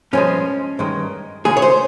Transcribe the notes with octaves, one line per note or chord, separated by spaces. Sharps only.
G2 F3 G#3 C#4
G2 D#3 G#3
D#2 C#3 G#3 G#4
C#5
C5